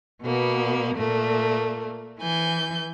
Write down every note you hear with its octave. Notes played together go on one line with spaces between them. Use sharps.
B2 A#3 B3
A#2 A3 A#3
E3 G#5 G6